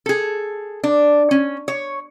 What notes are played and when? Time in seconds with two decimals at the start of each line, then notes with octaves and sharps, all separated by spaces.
0.06 G#4 A4
0.84 D4
1.31 C#4
1.68 C#5